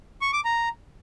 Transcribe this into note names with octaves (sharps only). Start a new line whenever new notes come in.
C#6
D6
A#5